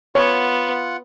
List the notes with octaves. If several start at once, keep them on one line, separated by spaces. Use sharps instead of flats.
B3 F4 C#5 F#5